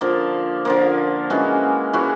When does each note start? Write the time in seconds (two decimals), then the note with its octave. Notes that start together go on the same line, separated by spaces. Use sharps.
0.01 D3 F3 A#3
0.65 D3 F3 A#3
1.30 E3 G#3 C#4 F#4
1.93 E3 G#3 C#4 F#4